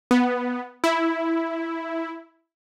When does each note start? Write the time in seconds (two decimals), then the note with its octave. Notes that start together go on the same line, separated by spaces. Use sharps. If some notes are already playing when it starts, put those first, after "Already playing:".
0.11 B3
0.84 E4